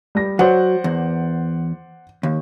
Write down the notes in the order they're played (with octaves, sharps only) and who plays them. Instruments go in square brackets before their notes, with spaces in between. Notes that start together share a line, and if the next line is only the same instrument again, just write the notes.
[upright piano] G3 A#6
[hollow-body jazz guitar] F#3 [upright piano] C5 D5 F#5
[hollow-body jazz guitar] E2
D#2